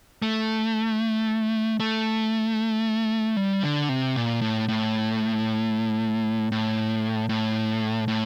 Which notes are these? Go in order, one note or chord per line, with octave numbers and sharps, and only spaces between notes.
A3
A3
G3
D3
C3
A#2
A2
A2
A2
A2
A2